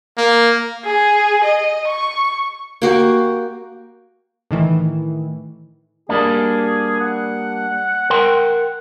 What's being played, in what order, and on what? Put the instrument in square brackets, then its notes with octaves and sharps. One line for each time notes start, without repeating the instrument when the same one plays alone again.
[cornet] A#3
[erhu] G#4
D#5
C#6
[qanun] A#3 F#4 G4
[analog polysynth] A2 D#3 E3
[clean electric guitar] G3 A#3 D4 [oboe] G#4
[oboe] F#5
[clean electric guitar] A#4 G5 C6